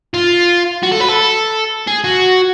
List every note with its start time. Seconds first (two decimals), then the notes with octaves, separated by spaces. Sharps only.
0.14 F4
0.83 F#4
0.92 A4
1.01 B4
1.09 A4
1.87 G#4
2.04 F#4